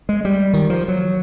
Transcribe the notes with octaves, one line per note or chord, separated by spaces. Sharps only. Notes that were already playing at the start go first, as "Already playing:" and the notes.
G#3
G3
D#3
F3
F#3